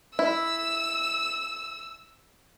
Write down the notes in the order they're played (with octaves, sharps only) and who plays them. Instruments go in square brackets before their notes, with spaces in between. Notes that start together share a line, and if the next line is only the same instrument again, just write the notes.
[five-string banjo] E4 [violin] E6